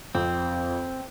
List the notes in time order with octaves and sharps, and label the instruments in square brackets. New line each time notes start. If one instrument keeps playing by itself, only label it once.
[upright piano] F2 [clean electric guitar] C4